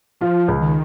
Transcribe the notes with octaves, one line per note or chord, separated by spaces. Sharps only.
F3 F4
C#2
D#3